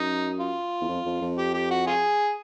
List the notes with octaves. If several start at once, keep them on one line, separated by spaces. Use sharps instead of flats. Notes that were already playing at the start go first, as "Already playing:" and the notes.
Already playing: F#2 D#4
F4
E2
F2
F2
F2
G4
G4
F#4
F4 G#4